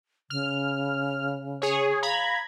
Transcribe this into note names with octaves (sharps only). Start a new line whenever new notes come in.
C#3 F6
G#4 C#5
F5 A#5 B5 G#6